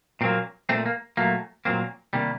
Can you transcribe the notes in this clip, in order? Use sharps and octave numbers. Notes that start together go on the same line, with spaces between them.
A#2 F#3 A#3 C4
A#2 A3 C4
A#3
A#2 F#3 A3 A#3
A#2 F#3 A#3 C4
C3 D#3 G3 A#3